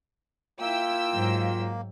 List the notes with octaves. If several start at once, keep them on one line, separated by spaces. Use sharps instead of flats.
A#3 E4 F4 G5 E6
G#2 F#3